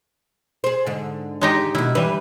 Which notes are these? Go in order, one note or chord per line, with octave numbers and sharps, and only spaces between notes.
G#4 C5
G#2 D3
G#3 D#4 G4
B2 D#3 E4
E3 G3 B4